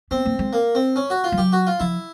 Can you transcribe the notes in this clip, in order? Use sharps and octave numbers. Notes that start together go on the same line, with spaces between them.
B3 C4
A#3
G#3
A#3
C4
C#4
F#4
F4
G3
F#3 G4
F#4
F4
F3 E4